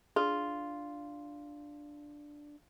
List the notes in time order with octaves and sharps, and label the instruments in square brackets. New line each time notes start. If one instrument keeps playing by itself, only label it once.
[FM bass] D4 [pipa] F4 [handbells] G#4